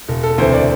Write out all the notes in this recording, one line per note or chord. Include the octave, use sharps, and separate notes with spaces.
E1
A4
D2 C3 E3 C5
D5